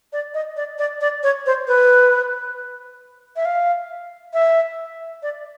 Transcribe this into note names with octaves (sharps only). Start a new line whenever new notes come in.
D5
D#5
D5
D5
D5
C#5
C5
B4
E5
F5
E5
D5